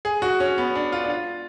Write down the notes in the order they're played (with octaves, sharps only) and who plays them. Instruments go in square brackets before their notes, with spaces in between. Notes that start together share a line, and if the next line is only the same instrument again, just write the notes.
[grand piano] G#4
F#4
C#4
B3
D4
F4
D4
F4